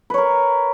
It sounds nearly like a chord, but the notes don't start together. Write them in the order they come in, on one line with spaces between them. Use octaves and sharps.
B4 C#5 A#4